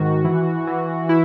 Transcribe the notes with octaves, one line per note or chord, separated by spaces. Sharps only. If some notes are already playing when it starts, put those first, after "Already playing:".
Already playing: G#2 D#3 F#4
E3
E3
E4